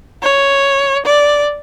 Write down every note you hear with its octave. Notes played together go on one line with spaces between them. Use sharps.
C#5
D5